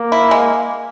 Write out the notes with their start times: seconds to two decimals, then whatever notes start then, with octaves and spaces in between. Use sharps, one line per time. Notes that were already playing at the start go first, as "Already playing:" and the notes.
Already playing: A#3
0.12 E4
0.31 G#3